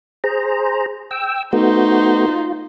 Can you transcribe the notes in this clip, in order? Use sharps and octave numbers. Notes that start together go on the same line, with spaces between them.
G#4 C5 A#5
G5 E6
A3 B3 D#4 F#4 C5
F4